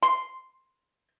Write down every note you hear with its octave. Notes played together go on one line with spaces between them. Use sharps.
C6